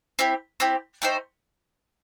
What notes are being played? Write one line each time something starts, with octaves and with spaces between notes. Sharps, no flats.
C4 E4 G4
C4 E4 G4
A3 D#4 G4 C5